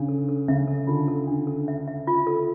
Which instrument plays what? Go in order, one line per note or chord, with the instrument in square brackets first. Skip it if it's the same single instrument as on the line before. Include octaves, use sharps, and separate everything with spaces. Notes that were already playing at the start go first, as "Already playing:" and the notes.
Already playing: [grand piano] C#3 [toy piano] D4
[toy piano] A4
A4
[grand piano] C#3 [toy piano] E5
[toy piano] A4
[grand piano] D3 [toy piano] F4
[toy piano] A4
D4
A4
E5
E5
F4
A4